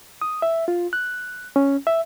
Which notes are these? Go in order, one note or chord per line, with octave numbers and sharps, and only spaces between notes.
D#6
E5
F4
F#6
C#4
E5